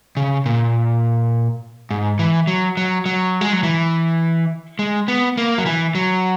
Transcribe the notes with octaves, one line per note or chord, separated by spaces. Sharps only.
C#3
A#2
G#2
E3
F#3
F#3
F#3
G#3
F#3
E3
G#3
B3
A#3
F#3
E3
F#3